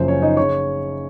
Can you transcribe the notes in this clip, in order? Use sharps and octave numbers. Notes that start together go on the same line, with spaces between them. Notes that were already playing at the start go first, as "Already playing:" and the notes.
Already playing: F#1 F#2 C#3 F3 C5
C#4 C#5
D#4 D#5
C#3 C#5 C#6